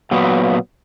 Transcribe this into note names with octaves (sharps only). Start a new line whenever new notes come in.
A#2 F#3 B3